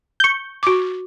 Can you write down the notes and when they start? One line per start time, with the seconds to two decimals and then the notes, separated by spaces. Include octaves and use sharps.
0.20 C#6 G6
0.63 F#4 D6